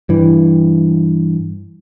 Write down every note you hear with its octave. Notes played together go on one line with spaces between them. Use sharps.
G2 E3